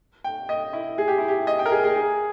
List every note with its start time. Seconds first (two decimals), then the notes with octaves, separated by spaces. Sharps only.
0.24 G5
0.49 D#5
0.73 E4
0.98 G#4
1.08 G4
1.18 E4
1.28 G4
1.47 D#5
1.59 G5
1.66 A#4
1.72 G#4
1.84 G#4
1.96 G#4